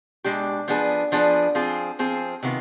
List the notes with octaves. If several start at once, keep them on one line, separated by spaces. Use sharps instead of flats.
B2 G#3 D4 G4
F3 B3 D4 G#4
F3 B3 D4 G#4
F3 C4 F4 G#4
F3 C4 F4 G#4
C3 D#3 B3 F4